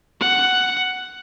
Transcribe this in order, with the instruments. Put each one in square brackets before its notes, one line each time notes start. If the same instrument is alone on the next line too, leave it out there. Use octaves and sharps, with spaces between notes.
[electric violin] F#5